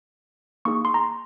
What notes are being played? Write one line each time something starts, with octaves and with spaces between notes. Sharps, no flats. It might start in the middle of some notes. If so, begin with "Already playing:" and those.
A#3 D#4 G#4 C#6
C6
A#5